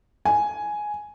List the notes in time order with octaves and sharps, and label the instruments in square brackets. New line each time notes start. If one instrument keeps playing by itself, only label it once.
[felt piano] G#5